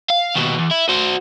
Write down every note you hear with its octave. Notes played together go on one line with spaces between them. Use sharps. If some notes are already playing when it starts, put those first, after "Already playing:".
F5
D#2 B2
E2
E4
F#4 C5